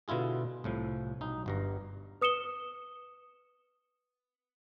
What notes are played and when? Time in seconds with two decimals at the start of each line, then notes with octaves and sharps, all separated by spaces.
0.08 B2 D3 E4 F4 G#4
0.64 C2 A2 F3
1.21 B1 D#4
1.46 G1 G2 A#5
2.21 B4 D#6 C#7 E7 G7